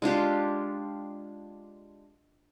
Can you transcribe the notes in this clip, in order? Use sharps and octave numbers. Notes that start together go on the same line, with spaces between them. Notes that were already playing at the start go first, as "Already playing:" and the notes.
G#3 D4 F4 G4